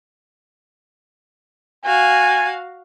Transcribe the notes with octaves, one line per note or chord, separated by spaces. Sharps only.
F#4 F5 G#5